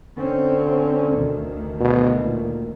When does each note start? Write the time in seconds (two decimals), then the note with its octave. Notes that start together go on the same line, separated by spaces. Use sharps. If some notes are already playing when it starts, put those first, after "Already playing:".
0.18 D3 C4 C#4
1.11 D2 D#3
1.80 B2
2.22 A#2